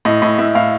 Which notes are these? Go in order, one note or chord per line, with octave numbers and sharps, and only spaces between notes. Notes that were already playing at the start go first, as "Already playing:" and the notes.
A2 D#5
A2 D#5
A2 E5
A2 F5